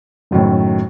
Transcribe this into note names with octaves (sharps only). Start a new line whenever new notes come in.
F#1 F#2 A2 D#3